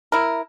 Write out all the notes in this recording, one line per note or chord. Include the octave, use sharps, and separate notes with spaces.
E4 A#4